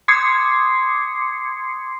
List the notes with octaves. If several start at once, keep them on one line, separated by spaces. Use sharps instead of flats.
C6 D6 D#6 G#6 C7 C#7